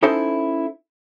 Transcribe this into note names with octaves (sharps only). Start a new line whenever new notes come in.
C#4 D#4 E4 A4 C5 E5